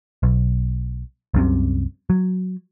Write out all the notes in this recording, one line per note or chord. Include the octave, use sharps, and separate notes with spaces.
B1
C2 F#2 C3
F#3